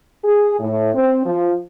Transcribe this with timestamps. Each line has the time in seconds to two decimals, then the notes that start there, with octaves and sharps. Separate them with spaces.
0.24 G#4
0.60 A2
0.94 C4
1.26 F3